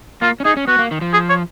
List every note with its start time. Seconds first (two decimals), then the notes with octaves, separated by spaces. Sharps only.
0.22 A#3 F4
0.40 C#4
0.45 D#4 G#4
0.57 C#4
0.68 B3 F#4
0.79 A#3
0.91 D#3
1.01 F3
1.13 G#4
1.29 C#5